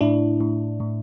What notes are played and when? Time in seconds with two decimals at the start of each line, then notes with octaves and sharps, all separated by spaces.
0.01 A2 D4 E4
0.41 A2
0.80 A2